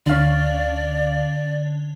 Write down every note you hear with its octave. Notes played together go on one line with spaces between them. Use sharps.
D2 D3 C#4 D5 F5